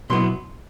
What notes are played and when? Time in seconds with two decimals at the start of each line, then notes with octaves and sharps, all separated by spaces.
0.10 B2 F#3 B3 E4 C6